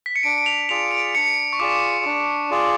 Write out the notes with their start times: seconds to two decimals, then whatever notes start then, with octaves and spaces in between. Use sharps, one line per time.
0.06 B6
0.16 C#7
0.23 D4 D7
0.38 D7
0.46 F7
0.69 F4 G#4 D5 F7
0.91 D7
1.15 D4 C#7
1.53 C#6
1.59 F4 G#4 D5 D6
2.05 D4
2.51 F4 G#4 D5